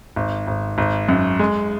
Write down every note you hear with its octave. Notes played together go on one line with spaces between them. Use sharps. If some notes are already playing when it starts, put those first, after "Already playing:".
G#1
G#1
G#1
F#2
G#3